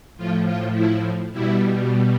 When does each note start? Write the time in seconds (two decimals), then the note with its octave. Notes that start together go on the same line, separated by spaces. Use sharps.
0.17 A2 F3 F4
0.46 F4
0.74 E4
1.32 B2 G3 E4